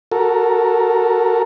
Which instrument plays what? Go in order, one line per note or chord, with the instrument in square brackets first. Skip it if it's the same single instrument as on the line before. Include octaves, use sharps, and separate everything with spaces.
[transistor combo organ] F#4 A4 A#4